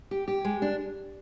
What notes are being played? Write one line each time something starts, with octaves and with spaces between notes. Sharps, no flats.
G4
G4
G#3
D4